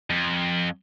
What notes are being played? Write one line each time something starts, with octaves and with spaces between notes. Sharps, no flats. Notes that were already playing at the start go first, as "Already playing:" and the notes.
F2